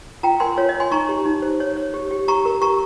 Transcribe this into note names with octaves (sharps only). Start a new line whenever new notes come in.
F4 G5 A#5
A#4 G#5 C6
F4 C#5
D#5
C#5
G#5 C6
D#4 A#5 C#6
G4
D#4
C5
C#5
C#5
G4
G4
G4 A#5 C#6
A#4
G4 A#5 C#6